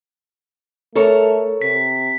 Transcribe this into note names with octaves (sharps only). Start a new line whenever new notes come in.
A3 A4 A#4 C#5
C3 B6